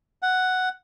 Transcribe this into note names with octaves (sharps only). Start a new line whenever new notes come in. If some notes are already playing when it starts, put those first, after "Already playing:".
F#5